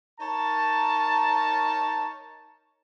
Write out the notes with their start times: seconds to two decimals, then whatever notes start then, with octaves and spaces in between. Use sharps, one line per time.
0.20 D#4 A#4 C#5 A5